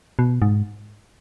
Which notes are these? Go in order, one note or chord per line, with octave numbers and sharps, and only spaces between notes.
B2
G#2